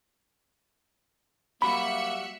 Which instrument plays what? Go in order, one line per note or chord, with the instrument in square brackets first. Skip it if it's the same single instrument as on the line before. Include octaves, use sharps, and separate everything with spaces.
[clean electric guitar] F#3 G3 F#4 [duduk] A#3 [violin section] E5 F#6 C#7 [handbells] B5